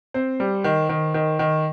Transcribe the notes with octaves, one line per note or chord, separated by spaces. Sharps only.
C4 C5
G3
D#3
D#3
D#3
D#3